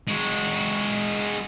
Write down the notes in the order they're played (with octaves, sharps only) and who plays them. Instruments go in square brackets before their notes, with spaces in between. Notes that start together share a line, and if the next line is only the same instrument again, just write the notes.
[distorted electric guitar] G#3 F#4